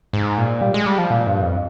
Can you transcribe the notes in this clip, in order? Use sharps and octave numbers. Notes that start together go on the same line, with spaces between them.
G#2
A#2
G3
G#3
G3
F3
A#2
G2
F2